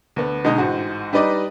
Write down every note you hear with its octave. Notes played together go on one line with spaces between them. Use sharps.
D2 B3
B2 D3 G#3 D#4
A1 G#2 F#4
G3 D#4 B4 D5 D#5 D6